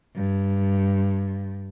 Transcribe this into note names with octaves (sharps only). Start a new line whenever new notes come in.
G2